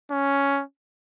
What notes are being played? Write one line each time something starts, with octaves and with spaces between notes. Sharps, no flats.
C#4